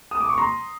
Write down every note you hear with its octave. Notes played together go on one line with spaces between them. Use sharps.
D#6
D6
C#6
A#5 C6